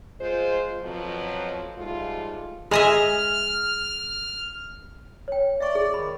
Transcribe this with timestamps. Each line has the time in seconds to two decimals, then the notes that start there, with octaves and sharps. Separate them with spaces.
0.21 G#3 F4 C5
0.82 F2 B2 F3 F#3
1.78 G#2 G3 A3 F4
2.71 G#3 G#4 D#5 E5 F6
5.28 C#5 G5
5.60 D5 E5 C#6
5.75 G#4
5.94 D#3 B5